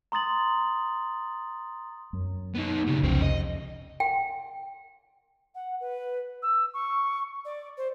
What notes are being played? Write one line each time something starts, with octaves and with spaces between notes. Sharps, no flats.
A#5 C6 D#6 A6 F#7
F#2
B3 D#4
C#3 G3
C2 F2 C#3 C#4 C5
D#5
G5
F#5
B4
E6
C#6
D5
C5